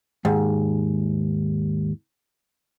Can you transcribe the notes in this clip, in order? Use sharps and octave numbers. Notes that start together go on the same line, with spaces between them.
D#2 G#2